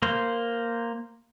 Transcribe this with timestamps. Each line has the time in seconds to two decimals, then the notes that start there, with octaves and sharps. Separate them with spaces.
0.02 A#3 C5